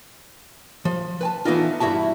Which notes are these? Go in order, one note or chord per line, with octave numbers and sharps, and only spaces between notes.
F3
B4 G#5 A5
E3 A3 B3 D4 D#4 F4
G2 E4 F#4 E5 A5